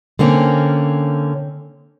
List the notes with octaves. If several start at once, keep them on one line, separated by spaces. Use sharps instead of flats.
D3 A#3 C4 C#4